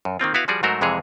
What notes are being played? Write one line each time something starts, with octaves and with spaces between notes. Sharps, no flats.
F#2
D#3 A#3 C4 F4
B3 E4 F#4 B4 F5
F3 G3 F#4 G#4 D5
G#2 F#3 A3 F#4 A#4 C5
F2 C3 E3 G#3 G#4 C#5